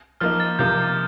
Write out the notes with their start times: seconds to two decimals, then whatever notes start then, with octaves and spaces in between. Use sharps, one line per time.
0.21 F3 A#3 D#4 F6
0.40 A6
0.59 C3 F3 A#3 G6